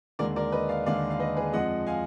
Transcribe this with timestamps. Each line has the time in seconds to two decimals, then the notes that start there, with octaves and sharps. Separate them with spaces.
0.19 D#2 D3 G#3 A#4 D5
0.36 A#4 D5
0.52 B4 D#5
0.69 D5 F5
0.86 D#2 D3 G#3 D5 F5
1.10 F5
1.19 B4 D#5
1.36 G#4 B4
1.53 F2 F3 G#3 D#5 F#5
1.87 F5 G#5